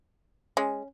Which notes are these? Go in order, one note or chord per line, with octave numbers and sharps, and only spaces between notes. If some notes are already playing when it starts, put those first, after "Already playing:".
G#3 C#4